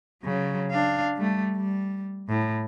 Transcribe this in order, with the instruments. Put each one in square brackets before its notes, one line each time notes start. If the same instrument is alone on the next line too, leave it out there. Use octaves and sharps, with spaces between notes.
[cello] C#3 F#3
D4 F5
G3 A3
G3
A2